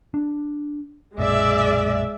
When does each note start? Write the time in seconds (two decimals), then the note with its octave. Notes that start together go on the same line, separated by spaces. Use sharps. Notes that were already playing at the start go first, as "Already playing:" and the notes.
0.14 D4
1.18 B1 F#2 A#2 G#3 D5 E5